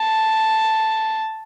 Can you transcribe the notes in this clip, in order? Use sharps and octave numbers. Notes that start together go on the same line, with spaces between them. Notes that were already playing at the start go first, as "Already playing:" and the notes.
Already playing: A5